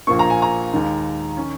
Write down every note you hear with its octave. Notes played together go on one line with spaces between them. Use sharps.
A#1 A#2 F3 A#3 C#6
A#5
G#5
A#5
D#2 D#3 G#3
D#3 C#4